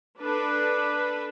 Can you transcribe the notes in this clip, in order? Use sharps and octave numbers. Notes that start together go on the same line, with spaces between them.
D4 A4 B4